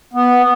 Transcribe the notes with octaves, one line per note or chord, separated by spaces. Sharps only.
B3